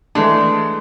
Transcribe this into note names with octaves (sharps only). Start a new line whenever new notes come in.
E3 G#3 A3 D4